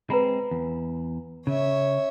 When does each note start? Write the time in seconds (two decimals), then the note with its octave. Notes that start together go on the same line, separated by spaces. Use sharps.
0.10 G#3 C4 B4 A#5 B5
0.51 E2
1.47 C#3 C#5 E5